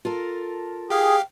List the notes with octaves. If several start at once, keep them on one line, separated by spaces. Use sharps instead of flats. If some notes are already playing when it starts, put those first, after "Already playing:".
F4 A4 A#4
G4 G#4 F5 G5